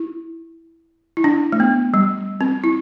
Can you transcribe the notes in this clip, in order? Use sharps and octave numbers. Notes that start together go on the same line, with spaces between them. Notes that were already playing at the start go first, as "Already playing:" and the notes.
Already playing: E4
E4
D4
A3
B3
G3
C4
E4